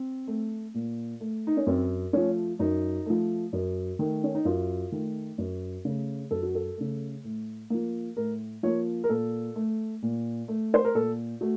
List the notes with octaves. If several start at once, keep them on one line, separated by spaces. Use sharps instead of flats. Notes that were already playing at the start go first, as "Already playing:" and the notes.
Already playing: C4
A3
A#2
A3
D#4
C#4
F#2 C4
F3 A3 C#4
F#2 D#4
F3 A3
F#2
D#3 A3
C#4
D#4
F#2 F4
D#3 A3
F#2
C#3 A3
F#2 A4
F#4
A4
C#3 A3
A2
F3 A#3
A2 A#4
F3 A#3 C#5
A#4
A#2 A4
A3
A#2
A3
C5
A#4
A#2 A4
A3 F#4